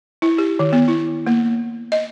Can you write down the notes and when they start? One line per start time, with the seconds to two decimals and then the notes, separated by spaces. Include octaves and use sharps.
0.22 E4
0.38 G4
0.59 D#3
0.73 B3
0.88 E4
1.27 A#3
1.92 D#5